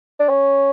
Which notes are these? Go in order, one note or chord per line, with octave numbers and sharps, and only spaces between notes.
D4
C#4